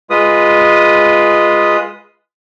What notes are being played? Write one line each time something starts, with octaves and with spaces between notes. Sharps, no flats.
G#3 F4 B4 D#6